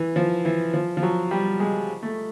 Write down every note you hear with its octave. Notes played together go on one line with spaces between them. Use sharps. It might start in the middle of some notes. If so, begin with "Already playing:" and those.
Already playing: E3
F3
E3
F3
F3
F#3
G3
G#3
A3